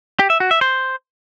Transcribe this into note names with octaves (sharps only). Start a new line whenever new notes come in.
G4
E5
F#4
E5
C5